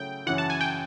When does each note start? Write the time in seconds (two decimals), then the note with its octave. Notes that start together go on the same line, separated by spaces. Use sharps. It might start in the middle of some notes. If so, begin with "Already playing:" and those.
Already playing: C#3 F#3 A3 E4 G5
0.27 F#2 C#3 E3 F#5
0.38 A5
0.50 G#5
0.61 G5